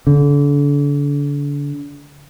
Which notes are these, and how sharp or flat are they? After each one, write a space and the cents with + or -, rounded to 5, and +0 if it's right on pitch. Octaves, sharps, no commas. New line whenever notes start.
D3 -35